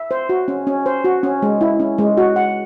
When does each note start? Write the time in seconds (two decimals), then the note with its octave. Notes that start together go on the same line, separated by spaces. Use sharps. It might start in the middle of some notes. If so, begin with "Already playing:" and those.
Already playing: E5
0.11 C5
0.29 F#4
0.48 C#4
0.67 C#4
0.86 C5
1.04 F#4
1.23 C#4
1.42 G#3
1.61 E4
1.80 C#4
1.98 G#3
2.17 F#4
2.36 F#5